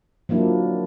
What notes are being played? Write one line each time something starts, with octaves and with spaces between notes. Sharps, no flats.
F3 F#3 A#3 D4 E4